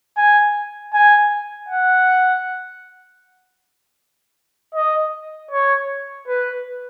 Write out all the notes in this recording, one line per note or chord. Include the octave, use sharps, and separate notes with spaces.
G#5
G#5
F#5
D#5
C#5
B4